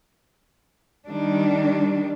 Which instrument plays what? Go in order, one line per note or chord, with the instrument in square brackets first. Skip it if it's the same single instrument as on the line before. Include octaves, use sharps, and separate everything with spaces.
[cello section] D#3 G3 D4